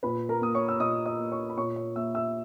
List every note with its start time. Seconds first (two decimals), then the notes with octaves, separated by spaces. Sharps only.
0.03 A#2 B4 B5
0.29 A#4 A#5
0.41 A#3 D#6
0.55 C#5 C#6
0.68 E6
0.80 A#2 D#5 D#6
1.06 D#5 D#6
1.19 A#3
1.31 C#5 C#6
1.50 B5
1.57 A#2 C#5 C#6
1.76 C#5 C#6
1.95 A#3 E5 E6
2.14 E5 E6